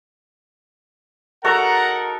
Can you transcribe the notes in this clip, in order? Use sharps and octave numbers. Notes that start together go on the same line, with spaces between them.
D#4 F#4 A4 A#4 F#5 A#5